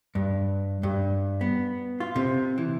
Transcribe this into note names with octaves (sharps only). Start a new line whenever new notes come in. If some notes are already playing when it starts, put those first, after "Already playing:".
G2
G2
B3
F4
C3
E3